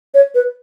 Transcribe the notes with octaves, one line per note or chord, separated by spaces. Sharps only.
C#5
B4